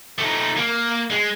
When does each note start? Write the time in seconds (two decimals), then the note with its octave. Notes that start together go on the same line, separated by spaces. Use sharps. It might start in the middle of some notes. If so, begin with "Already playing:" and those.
0.18 A3 D#4
0.57 A#3
1.10 G#3